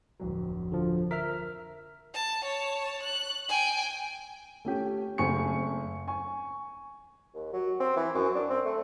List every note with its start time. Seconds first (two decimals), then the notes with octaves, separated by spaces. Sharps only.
0.20 D1 F2 F#3
0.72 D3 F3
1.11 A#4 E5 F6 B6
2.15 A5
2.44 C#5 A5
3.03 F#6
3.49 G5 G#5
4.65 A3 C#4 G4
5.18 F#1 A3 C4 G#5 C#6 C#7
6.08 G#5 C#6
7.34 D#2
7.53 F#3
7.80 C4
7.96 E3
8.15 F#2
8.35 D4
8.50 C4
8.65 A3